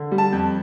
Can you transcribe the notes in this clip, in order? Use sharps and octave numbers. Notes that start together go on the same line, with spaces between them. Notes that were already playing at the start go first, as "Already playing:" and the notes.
Already playing: D3
G3
A5
F2